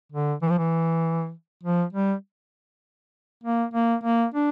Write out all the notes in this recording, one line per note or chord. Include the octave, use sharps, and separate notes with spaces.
D3
E3
F3
E3
F3
G3
A#3
A#3
A#3
D4